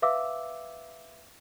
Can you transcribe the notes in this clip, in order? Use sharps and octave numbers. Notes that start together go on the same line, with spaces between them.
B4 E5 F5 D6 E6